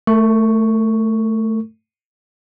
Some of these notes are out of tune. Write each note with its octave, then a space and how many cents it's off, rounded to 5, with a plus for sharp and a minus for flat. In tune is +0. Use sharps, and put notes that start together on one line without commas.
A3 +0 A#4 -40 C#6 +0